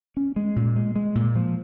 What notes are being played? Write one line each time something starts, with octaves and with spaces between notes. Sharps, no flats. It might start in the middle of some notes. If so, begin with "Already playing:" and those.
C#4
G#3
A#2
G#3
G#3
A#2
F3